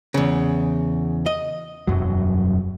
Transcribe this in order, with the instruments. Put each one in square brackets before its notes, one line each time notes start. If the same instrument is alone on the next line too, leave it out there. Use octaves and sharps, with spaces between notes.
[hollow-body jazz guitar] E2 C#3
D#5
[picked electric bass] E1 F#2 F#3